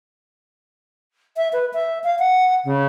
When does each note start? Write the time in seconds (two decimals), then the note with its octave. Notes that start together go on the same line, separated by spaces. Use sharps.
1.37 E5
1.53 B4
1.73 E5
2.04 F5
2.19 F#5
2.65 C#3